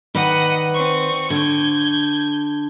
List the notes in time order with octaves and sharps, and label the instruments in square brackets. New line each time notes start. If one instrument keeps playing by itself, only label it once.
[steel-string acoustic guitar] D#3 B4 D5 [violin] D#5 F#5
[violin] C4 C#6
[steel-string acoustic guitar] D3 [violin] G6 G#6